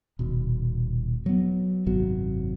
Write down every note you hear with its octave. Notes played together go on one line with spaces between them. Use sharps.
D#1 B2
F#3 B3
G#1 F#2 C3 F#3